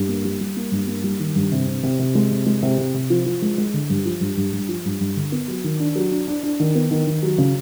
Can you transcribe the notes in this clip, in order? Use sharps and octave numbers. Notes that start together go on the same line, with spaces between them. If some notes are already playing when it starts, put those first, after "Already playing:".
Already playing: G2
A#3
G3
G3
A#3
G2
A#3
G3
D#3
G2
C3
C3
C3
C3
G#3
C3
G#3
C3
C3
C3
F3
F3
G#3
G#3
D3
G2
F3
G2
G2
G2
F3
G2
G2
D3
B3
F#3
D#3
D4
F#3
D4
D4
D4
D#3
B3
D#3
D#3
F#3
C#3